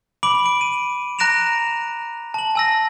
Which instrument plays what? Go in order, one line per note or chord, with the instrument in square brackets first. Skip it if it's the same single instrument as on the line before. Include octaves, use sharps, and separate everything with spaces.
[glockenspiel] B5 D6 D7 F#7
D7
D#7
A#5 F#6 A#6 D7 E7 F7
A5 F#7
G#5 E6 A#6